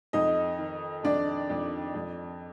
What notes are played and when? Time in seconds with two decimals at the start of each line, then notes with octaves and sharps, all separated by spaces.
0.13 F2 D#4 D#5
0.59 D#3
1.04 F2 D4 D5
1.50 F2
1.94 F2